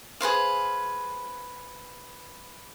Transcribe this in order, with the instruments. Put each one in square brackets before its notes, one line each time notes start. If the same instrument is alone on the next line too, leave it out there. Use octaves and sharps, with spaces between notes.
[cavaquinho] G#4 B4 C5 F5